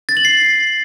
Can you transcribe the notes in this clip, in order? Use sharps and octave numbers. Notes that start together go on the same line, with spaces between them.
A6
F#7
C7